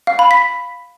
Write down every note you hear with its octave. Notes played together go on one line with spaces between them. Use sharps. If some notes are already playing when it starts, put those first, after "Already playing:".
F5
B5
B6